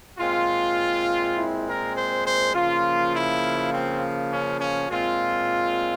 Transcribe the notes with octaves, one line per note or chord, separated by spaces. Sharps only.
A#2 G#3 C4 F4
E4
A#4
C5
C5
C#3 F3 A#3 F4
E4
C4
C#4
C#4
A#2 G#3 C4 F4